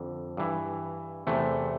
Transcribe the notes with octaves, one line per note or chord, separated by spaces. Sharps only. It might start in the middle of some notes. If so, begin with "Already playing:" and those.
Already playing: F2 D3
G2 E3
E2 C3 E3 A3